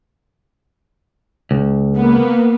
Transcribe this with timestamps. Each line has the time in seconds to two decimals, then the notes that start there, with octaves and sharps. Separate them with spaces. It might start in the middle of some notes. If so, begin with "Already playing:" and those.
1.51 C#2
1.95 A#3 B3